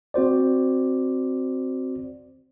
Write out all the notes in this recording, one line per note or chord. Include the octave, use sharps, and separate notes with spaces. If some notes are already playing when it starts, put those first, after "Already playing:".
C4 F#4 C5 D5